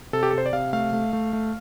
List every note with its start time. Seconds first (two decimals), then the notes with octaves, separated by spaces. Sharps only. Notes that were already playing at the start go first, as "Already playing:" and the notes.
0.13 C3 A4
0.23 G4
0.30 A4
0.33 C3 C5
0.46 D5
0.53 C3 F5
0.73 A3 F5
0.93 A3
1.13 A3
1.33 A3